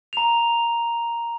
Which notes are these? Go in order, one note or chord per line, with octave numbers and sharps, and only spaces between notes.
A#5 F7